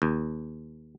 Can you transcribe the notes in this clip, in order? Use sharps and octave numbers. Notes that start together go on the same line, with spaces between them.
D#2